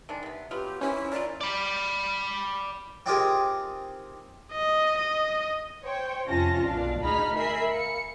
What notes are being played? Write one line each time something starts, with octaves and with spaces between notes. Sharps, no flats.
D#3 G#3 D4
C3 B3
F#3 B3 F4 G4 F6
E3 C#4 E4 C5
F4 A#4 D5
D5 B5
C4 D#4 F4 G4 G#4 A#4
D#5
D#5
C5 C#5 G5
F2 C3 C#4 F4 A5 A#6
B1 A#2 D4 F5
D2 D#4 G#4 A#5 B5 F6
A#4 E5 G#5 B5 C7
F5 C#7